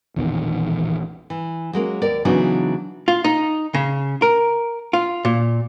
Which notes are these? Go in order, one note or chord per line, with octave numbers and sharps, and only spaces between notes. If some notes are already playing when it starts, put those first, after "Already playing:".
E1 A#1 E2 D#3
E3
F#3 G#3 A#3 C#4
D#2 A#4 D5
C#3 E3 F#3 B3 D4 D#4
F4
D#4
C#3
A#4
F4
A#2